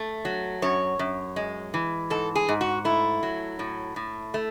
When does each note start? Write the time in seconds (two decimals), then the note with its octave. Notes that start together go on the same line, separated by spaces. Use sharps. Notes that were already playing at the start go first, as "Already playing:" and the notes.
Already playing: A3
0.25 F#3
0.62 F#2 C#5
0.99 F#2
1.36 G#3
1.74 E3
2.10 G#2 A4
2.35 G#4
2.49 G#2
2.61 F#4
2.85 A3 E4
3.23 F#3
3.59 A2
3.96 A2
4.34 A3